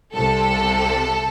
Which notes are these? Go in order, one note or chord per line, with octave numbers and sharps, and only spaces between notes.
C2 C3 A4